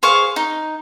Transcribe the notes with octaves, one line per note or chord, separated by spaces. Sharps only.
G#4 C5 F5 C#6
D#4